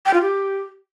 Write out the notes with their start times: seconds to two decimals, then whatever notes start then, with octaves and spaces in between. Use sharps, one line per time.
0.05 G5
0.14 F4
0.22 G4